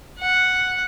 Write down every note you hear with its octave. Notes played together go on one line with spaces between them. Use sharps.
F#5